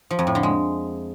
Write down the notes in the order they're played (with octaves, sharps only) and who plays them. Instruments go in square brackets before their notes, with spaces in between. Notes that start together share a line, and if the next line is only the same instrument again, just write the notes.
[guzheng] F3
F2
A2
D3
G#3